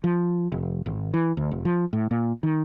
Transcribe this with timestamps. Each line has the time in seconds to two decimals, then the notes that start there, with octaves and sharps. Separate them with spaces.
0.04 F3
0.52 F1
0.86 G#1
1.14 E3
1.37 D2
1.51 F1
1.65 F3
1.93 A2
2.11 A#2
2.43 D#3